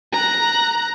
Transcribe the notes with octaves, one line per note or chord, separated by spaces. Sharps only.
A#5 F#6